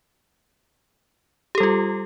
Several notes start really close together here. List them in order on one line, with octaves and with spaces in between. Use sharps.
G4 A4 G3 F4